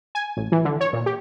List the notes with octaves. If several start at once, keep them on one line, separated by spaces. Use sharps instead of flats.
G#5
A1
E3
D3
C#5
A#2
G4